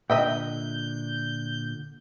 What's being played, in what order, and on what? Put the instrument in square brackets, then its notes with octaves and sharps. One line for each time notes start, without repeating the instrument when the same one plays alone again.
[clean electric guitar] A#2 D3 [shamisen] D#5 E5 G5 [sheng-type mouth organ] G6